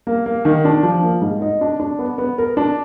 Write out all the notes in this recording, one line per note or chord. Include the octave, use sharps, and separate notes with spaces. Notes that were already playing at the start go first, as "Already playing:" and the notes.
A#3
A#3
D#3
D4
F3
A#3
G#2
D#4
D4
D4
B3
B3
A#4
D4